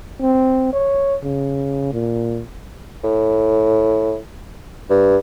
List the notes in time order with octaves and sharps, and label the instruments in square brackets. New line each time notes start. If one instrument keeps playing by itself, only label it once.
[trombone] C4
C#5
C#3
A#2
[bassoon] A2
G2